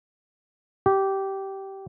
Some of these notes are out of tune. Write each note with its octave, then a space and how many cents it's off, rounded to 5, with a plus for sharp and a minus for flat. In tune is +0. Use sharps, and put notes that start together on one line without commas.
G4 -15